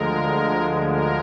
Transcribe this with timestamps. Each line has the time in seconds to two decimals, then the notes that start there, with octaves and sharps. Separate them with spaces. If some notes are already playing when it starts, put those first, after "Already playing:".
Already playing: D2 D3 F3 G#3 A#4
0.85 A#4